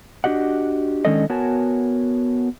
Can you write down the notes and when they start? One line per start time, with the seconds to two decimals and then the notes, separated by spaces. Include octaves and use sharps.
0.24 D4 F#4 G4 D#5 F#5
1.05 D#3 G#3 C#4 D4 A4 D#5
1.30 B3 F#4 A#4 C#5 G#5 A5